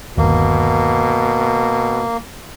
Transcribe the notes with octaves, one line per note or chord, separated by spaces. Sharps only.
G1 D#2 B2 A#3